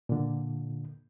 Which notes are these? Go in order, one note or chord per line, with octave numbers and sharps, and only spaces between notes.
A#2 D3